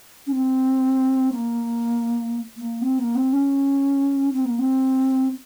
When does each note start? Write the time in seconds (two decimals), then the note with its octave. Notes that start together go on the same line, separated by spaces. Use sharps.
0.27 C#4
0.32 C4
1.32 A#3
2.57 A#3
2.82 C4
2.99 A#3
3.15 C4
3.32 C#4
4.32 C4
4.45 A#3
4.59 C4